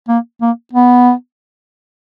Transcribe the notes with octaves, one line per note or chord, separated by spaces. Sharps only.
A#3
A#3
B3